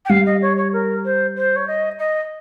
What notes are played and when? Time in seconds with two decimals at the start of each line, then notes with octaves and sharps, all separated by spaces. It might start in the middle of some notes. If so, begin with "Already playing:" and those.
0.05 G5
0.09 G3 F5
0.26 D#5
0.42 C#5
0.57 C#5
0.73 A#4
1.05 C5
1.36 C5
1.56 C#5
1.67 D#5
1.99 D#5